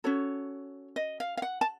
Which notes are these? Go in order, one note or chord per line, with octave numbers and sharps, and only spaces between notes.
C#4 F#4 A4 C#5
D#5
F5
F5
F#5
A5